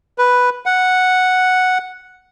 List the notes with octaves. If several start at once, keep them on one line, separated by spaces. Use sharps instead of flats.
B4
F#5